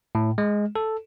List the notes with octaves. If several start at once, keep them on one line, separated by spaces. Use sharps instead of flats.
A2
G#3
A4